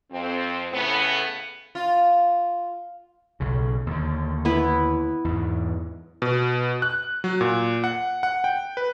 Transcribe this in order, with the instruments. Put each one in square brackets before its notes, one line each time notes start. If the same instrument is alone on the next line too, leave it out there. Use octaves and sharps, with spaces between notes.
[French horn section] F2 C4
A2 C#3 B3
[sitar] F4
[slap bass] B1 C#3
D#2 D3
[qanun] B3 E4 B4
[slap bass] E2 G#2
[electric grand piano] B2
F#6
F#3
A#2
F#5
F#5
G5
B4